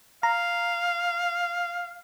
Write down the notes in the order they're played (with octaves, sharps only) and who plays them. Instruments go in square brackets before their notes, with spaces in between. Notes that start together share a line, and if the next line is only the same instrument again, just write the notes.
[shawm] F5 [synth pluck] A#5